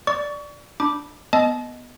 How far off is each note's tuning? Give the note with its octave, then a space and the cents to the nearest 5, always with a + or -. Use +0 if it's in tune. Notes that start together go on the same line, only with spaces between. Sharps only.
D5 +0 C#6 +35
D4 +0 B5 -10 D6 +0
B3 +0 D#5 +0 A5 -35